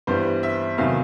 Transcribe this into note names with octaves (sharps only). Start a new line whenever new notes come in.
G2 E3 G3 B3 C5
E5
E2 C3 D#3 F#3 A3 F5